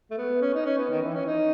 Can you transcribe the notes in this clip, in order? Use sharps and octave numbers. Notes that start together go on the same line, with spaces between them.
A3
B3
C#4
D#4
C#4
B3
D#3
E3
C#4
D#4